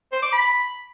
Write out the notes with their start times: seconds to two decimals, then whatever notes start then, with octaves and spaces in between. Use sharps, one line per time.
0.12 C5
0.22 D6
0.33 B5